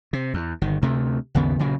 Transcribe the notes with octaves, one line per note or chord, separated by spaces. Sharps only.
C3
E2
G1 D#3
D2 C3 A3
G#1 D#2 C#3 B3
B1 A#2 C#3 F#3